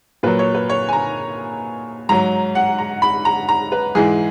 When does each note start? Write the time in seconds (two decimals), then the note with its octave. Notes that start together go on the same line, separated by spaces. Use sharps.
0.23 A#2 F#3 B4
0.39 C#5
0.55 B4
0.69 C#5
0.89 G#5
0.93 A#5
2.09 G#2 F#3 A#5
2.55 F#5
2.79 A#5
3.02 B5
3.25 A#5
3.49 A#5
3.72 B4
3.95 G#2 E3 G#3 G#4